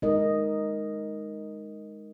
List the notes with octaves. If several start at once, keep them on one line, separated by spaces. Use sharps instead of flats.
G#3 D#4 A#4 D#5